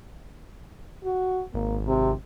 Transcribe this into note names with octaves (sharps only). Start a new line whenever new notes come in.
F#4
G#1 A#3
C3